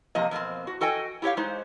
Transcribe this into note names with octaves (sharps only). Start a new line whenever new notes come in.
C3 F3 A#3 D#5
F2 B2 A#3 C4
F#4
F#4 A4 D#5 G5 G#5
E4 G4 C#5 F5
G#3 D#4 C5